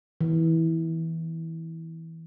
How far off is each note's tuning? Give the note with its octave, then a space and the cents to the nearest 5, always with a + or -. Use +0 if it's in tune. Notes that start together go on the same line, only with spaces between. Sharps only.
E3 -20